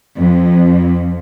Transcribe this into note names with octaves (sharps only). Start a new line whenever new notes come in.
F2